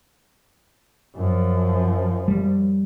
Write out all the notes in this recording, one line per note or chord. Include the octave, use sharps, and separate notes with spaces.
F#2 F3
G3